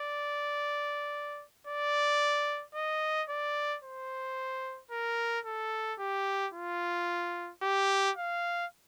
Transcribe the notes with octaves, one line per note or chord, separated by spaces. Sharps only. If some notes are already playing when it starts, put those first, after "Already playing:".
Already playing: D5
D5
D#5
D5
C5
A#4
A4
G4
F4
G4
F5